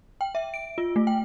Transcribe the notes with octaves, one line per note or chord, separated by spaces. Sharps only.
G5
E5
D7
F4
A3
G5